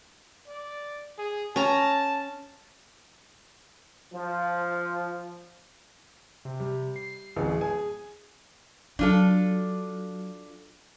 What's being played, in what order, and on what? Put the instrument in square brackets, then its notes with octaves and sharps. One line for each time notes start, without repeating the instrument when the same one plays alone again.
[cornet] D5
G#4
[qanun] C#4 A#5 [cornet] A5
[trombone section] F3
[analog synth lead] C3
[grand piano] G3
[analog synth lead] C7
[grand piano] D1 A1 [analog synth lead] G#4
[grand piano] G#5
[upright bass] F#3 [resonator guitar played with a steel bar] D4 F4 A4